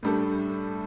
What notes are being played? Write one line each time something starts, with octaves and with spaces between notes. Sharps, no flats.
A2 G3 D4 A4